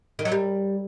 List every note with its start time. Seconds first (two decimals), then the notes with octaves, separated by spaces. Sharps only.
0.19 D#3
0.25 F#3
0.32 G3